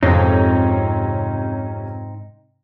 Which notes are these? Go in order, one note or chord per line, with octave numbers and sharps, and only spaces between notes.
F2 G#2 C3 C4 C#4 D#4